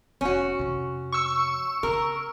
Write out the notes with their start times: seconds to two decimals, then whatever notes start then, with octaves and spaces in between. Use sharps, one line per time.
0.21 F1 C#4 F#4
0.59 F2 C3
1.12 C#6 E6
1.83 C#3 A#4